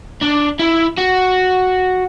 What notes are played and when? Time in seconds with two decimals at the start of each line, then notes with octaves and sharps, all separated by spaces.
0.22 D4
0.59 E4
0.98 F#4